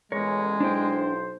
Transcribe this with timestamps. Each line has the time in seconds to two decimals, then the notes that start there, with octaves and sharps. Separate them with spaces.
0.12 A1 E2 G#3 A#4 C#5
0.60 B1 D4 E4 C5 G5